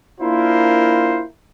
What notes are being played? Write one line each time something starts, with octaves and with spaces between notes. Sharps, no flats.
A#3 D4 E4 F4 A#4 C5